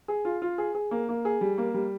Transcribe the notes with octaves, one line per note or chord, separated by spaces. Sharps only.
G#4
F4
F4
G#4
G#4
A#3
A#3
G#4
G3
A#3
G3